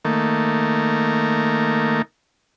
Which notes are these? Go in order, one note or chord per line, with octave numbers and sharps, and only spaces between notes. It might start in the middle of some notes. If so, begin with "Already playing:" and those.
D#3 A3 A#3